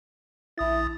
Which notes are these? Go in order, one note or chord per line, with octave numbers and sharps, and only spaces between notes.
A#1 E4 D#6 A6